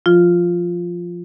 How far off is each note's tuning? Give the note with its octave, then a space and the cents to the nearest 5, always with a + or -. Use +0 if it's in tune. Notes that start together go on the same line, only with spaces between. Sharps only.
F3 +0 F4 +0